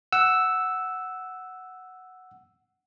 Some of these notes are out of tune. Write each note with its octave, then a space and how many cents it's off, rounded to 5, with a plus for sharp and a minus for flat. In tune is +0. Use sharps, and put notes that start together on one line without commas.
F#5 +0 E6 +0